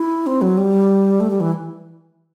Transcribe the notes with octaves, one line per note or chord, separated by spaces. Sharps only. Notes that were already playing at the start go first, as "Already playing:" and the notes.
Already playing: E4
C4
F#3
G3
A3
G3
E3